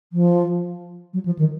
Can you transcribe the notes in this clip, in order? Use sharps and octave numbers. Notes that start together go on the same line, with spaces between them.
F3
F#3
F3
D#3